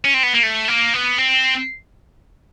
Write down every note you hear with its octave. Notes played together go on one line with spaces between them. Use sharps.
C#4
C4
B3
A#3
A3
A#3
B3
C4